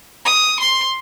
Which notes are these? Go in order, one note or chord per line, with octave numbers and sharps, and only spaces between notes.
D#6
C6